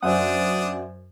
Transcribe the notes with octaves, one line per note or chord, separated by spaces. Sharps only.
F#2 D4 C5 D5 E5 F#5 G#5 D#6